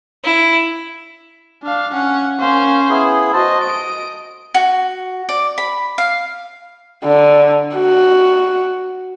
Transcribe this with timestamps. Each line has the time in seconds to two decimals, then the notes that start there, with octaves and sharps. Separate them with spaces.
0.24 E4
1.63 D4 F5
1.92 C#4 F#5
2.40 A#3 C#4 C5
2.89 B3 E4 G#4
3.33 F#4 C5 D#5 A5
3.63 D#5 D7
4.54 F#4
5.29 D5
5.58 B5
5.98 F5
7.04 D3
7.75 F#4